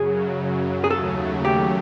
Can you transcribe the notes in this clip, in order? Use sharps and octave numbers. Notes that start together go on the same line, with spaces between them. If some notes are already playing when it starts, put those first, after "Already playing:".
Already playing: F#2 C#3 F#3 G#4
G#4
D#2 C#3 F#3 A3 A4
G4